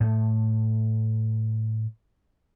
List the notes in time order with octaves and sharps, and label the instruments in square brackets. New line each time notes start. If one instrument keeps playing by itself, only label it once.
[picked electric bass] A2 A3